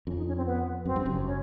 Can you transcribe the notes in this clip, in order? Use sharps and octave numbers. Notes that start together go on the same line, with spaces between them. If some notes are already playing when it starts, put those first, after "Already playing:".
F2 C#4
D#4
C#4
C4
B3
F#2 C4
G2
F#1 F#2
C#4